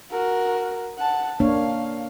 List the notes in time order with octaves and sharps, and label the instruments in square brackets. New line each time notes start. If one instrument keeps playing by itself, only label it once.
[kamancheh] F#4 A#4
F#5 A5
[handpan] A#3 D4 C#5 [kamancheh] F5